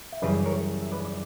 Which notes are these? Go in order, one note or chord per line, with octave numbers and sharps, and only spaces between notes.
E5
F#2 C#3 E3 G3 B4 D5
A#4 C#5
E5
B4 D5
D5